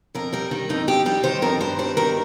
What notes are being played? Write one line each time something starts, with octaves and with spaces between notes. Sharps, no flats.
F2 A#4
G3 A#4
D#3
F2 D#4
F2 G4
G3 G4
D#3 C5
F2 A#4
G2 C5
G3 C5
D#3 A#4